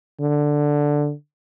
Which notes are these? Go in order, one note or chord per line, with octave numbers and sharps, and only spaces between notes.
D3